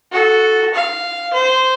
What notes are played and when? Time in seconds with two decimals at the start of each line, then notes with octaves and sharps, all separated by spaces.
0.12 F#4 A4
0.74 F5
1.33 C5